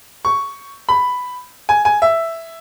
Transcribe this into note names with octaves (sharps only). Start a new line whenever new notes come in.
C#6
B5
G#5
G#5
E5